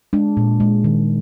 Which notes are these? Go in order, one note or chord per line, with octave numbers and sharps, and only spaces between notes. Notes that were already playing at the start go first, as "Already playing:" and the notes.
G#3 D4
A#2
G#3
D#3